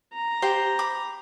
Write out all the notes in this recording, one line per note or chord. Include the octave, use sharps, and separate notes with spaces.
A#5
G4 C5 G5
B5 D6